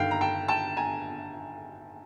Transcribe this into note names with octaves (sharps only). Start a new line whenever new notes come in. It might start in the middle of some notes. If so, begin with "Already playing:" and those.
Already playing: G1 G2 D#3 F5 G5
A#5
G5 A5
G5 A5
G#5 A#5